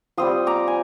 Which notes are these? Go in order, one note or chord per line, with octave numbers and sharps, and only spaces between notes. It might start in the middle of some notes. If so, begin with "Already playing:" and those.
G3 C4 F4 C6 D#6
A#5 D6
G#5